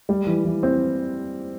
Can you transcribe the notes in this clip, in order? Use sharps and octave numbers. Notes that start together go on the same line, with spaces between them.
G3
E3
E3
C4